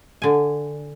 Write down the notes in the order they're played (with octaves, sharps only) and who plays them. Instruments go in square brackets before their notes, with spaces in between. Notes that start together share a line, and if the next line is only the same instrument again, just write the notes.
[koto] D3 G#5